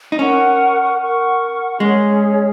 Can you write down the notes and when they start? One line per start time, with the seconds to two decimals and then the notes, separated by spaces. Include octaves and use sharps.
0.12 D#4
0.19 C#4 A#4 F#5 C#6
0.99 A#4 F#5 C#6
1.80 G#3 C#4 G#4 C#5